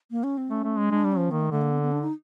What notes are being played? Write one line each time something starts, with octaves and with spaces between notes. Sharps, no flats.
A#3
C#4
C4
A3 C#4
A3
G#3
G#3 D4
G3
C#4
F3
D#3 A#3
A3
D3 A3
A#3
B3
B3
D4
D#4